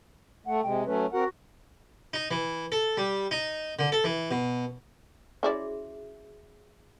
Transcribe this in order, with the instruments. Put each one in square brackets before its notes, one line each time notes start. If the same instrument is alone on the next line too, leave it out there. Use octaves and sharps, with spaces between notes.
[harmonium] A3 [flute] F#5
[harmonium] C3 G#3 [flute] G5
[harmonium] F#3 A3 C#4 [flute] B4
[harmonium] C4 A#4 F#5 [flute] F#4
[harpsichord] D#4
E3
A4
G3
D#4
D3
A4
E3
B2
[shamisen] C#4 E4 D5 [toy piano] F#4 G#4 E5